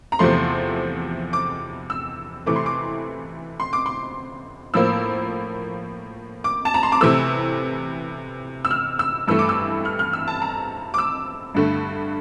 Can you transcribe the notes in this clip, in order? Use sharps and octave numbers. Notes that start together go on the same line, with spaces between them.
A#5
E2 C3 F3 A3 C6
D6
E6
C3 E3 A3 D6
C6
D6
C6
D6
C6
A2 F3 A#3 E6
D6
A5
A#5
C6
D6
C3 E3 A3 E6
E6
F6
E6
G2 E3 A3 E6
D6
E6
F6
F6
E6
A5
A#5
D6
E6
G2 D3 A3